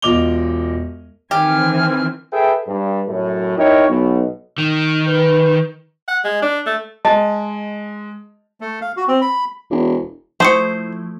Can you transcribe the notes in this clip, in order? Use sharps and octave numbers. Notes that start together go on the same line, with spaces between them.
E1 F4 D#5 D6 F7 G7
D#3 E3 C4 G4 G#5 F6
G#4 A4 B4 E5 G5
G2
F#2 A2
D#4 E4 A#4 C#5 G5
B1 B2
D#3
B4
F#5
G#3
D4
A3
G#3 D#5 A5
A3
F5
F#4
C4
B5
E1
F3 A3 E4 C5 C#6 D#6 C#7